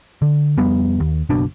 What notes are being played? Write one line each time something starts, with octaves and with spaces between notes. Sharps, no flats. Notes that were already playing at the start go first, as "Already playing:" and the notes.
D3
F2 G3 B3
D#2
F#1 B1 B2 D4